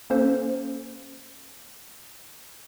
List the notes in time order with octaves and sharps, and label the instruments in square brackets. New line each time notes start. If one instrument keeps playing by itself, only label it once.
[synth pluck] A#3 C#4 A4 C5